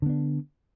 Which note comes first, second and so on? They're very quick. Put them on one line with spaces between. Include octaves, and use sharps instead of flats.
D3 B3 D4